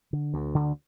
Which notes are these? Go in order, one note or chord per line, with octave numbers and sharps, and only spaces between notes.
D3
D2
D3